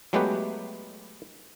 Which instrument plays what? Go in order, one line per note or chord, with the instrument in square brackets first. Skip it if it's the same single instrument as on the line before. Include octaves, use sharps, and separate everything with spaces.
[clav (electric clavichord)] F#3 G#3 A3 B3 G4 B4